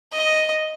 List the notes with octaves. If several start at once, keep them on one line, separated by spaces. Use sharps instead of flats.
D#5